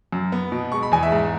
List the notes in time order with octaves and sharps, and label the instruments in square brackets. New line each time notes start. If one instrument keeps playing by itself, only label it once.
[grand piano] F#2
B3
B2
G#3 C#6
B5
E2 G#5
E5
G#2